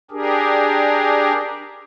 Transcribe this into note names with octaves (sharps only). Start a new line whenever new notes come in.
D4 G4 G#4 A#4